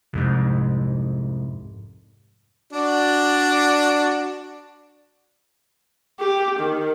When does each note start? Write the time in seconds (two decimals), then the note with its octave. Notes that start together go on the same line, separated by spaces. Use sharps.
0.13 C2 F2 G#2
2.73 D4 F#4 D5
6.20 G4
6.59 D#3